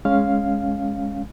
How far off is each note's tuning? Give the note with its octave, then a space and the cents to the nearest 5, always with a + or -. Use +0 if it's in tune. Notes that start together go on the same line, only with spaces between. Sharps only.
G#3 +0 C#4 +0 F5 +0